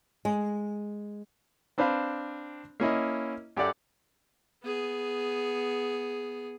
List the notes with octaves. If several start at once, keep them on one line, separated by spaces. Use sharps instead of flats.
G#3
C4 D4 B4 C5 F5 B5
A#3 C#4 E4 D#5
F#2 G4 A4 D5 F#5
B3 G#4